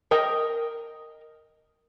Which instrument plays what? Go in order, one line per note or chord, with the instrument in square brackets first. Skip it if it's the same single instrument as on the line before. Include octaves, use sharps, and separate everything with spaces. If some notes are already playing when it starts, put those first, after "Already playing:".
[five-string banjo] A#4 D#5 G5 A#5